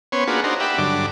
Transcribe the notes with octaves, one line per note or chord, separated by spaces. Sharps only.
B3 C#4 C5 C#5
A#3 D4 F4 F#4 G#4 B4
D4 D#4 F#4 A#4 C5
G4 D5 E5 F#5 B5
G2 D3 F#3 D4 D6